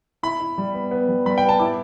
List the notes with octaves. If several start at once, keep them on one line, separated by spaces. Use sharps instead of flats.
E4 B5
E4
G3
B3
B3
G3
G3 B5
G5
B3
A5
E4 D6